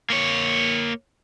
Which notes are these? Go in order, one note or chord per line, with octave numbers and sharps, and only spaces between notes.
A#3 C#5